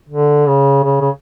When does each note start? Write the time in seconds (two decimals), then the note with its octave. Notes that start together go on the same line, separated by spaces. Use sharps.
0.09 D3
0.47 C#3
0.84 C#3
1.01 C#3